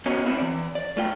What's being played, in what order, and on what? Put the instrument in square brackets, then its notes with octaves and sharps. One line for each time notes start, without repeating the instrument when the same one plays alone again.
[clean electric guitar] B3 C#4 F#4 A#4 C#5 D#5
C#2 C4 C#4 E4
E3 D5
D5
A3 F4 G5